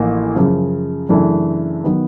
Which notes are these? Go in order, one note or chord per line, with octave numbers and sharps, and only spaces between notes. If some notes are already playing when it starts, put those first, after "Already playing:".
Already playing: A1 A2 F3 A#3 D#4
F#2 C#3 F3
F#2 C#3 E3 A3 D4
D#3 F#3 B3